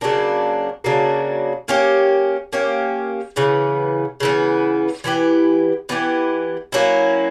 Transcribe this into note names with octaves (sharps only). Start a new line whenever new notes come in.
C#3 F#3 A#3 D4
C#3 F#3 A#3 D4
A#3 C#4 G4
A#3 C#4 G4
C#3 E3 B3
C#3 E3 B3
E3 B3 E4 G4
E3 B3 E4 G4
F#3 A#3 C#4 E4